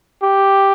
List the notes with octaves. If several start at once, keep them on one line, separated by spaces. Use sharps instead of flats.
G4